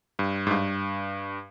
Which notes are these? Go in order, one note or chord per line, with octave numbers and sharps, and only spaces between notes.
G2
G#2
G2